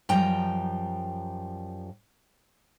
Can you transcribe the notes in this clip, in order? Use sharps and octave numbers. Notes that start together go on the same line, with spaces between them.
F#2 F3 G3 G5 A#5